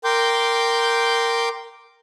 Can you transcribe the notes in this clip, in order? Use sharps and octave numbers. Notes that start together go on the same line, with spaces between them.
A#4 G5 C6 D6 G6